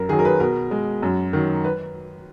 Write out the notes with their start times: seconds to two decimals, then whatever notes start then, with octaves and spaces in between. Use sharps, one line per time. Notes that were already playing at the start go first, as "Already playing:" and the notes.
Already playing: F#2 A#4
0.09 D#3 F#3 G#4
0.19 A#4
0.25 B4
0.40 B2 A#4
0.71 G#3
1.03 F#2
1.33 D#3 F#3
1.64 B4